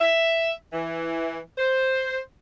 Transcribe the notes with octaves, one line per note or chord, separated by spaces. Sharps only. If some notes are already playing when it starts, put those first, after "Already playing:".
E5
E3
C5